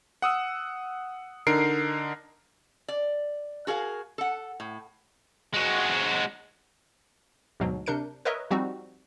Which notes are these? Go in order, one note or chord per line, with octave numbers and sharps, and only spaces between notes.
F#5 D#6 E6
D3 D#4 A#4 C7 D7
D5
F#4 G#4 A#4 F5
A4 F#5
A2
G#3 F#4
D2 G#2 B2 F#3
C3 D4 A#4 G6 C#7
A#4 B4 C#5 D#5 E5
F3 G3 C4 D#4 F#4